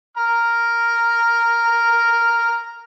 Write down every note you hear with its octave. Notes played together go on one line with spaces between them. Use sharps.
A#5 F6